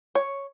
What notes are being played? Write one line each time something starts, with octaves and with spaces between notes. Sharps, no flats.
C#5